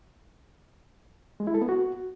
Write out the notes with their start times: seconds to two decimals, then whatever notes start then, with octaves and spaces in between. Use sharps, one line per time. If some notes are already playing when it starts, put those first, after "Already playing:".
1.40 G#3
1.47 E4
1.54 A4
1.62 B3
1.69 F#4